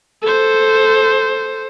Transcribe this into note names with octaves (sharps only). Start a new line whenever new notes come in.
A4 C5